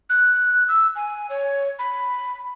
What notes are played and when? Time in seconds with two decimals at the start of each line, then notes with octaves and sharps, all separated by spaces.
0.10 F#6
0.68 E6
0.96 G#5
1.30 C#5
1.79 B5